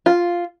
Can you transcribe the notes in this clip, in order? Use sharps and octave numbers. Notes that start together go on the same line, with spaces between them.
F4